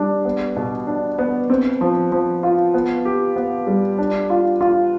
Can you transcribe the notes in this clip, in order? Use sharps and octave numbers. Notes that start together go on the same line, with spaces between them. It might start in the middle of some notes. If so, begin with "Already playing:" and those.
Already playing: G3 D4
B3
B2
D4
B3
C4
F3
F3
F4
B3
G4
B3
G3
D4
F4
F4